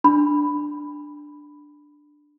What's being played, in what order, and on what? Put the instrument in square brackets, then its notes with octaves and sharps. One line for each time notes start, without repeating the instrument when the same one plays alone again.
[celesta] D4 B5